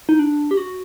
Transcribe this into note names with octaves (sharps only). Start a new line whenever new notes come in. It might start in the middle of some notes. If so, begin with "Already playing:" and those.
D#4
D4
G4
F#4